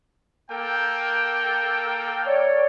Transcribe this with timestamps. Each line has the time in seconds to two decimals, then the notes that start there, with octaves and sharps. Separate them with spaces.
0.49 A#3 A4 G5
2.27 C#5 D5